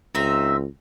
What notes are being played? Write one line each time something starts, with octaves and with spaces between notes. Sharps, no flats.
C#2 C4 D#4 E5